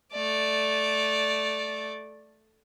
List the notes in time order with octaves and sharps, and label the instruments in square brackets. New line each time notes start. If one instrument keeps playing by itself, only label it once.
[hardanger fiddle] A3 D5